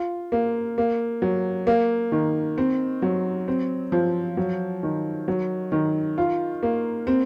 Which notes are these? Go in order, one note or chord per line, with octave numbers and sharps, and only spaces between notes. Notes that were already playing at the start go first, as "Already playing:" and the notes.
Already playing: F4
A#3
A#3
F#3
A#3
D#3
C4
F#3
C4
F3
F#3
D#3
F#3
D#3
F4
A#3
C4